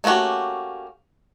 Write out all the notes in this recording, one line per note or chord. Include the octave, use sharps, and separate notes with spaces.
A3 A#3 C#4 F#4 G4